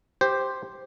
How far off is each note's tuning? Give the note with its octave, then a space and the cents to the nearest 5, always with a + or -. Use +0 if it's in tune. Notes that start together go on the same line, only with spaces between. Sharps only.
G4 +0 C5 +0